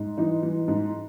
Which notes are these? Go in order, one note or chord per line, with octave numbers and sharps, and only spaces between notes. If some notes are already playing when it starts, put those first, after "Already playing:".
Already playing: G#2
E3 D#4
E3
G#2